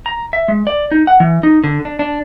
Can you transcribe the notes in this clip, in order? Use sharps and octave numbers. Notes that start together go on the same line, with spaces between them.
A#5
E5
G#3
D5
D#4
F#5
E3
D#4
D3
D4
D4